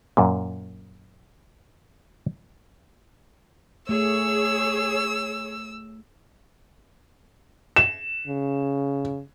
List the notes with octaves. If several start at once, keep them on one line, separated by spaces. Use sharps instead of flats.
F#2 A#2
A3 G#4 C#5 E6
E7
C#3